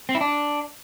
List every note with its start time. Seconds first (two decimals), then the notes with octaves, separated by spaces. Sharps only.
0.09 C4
0.15 E4
0.21 D4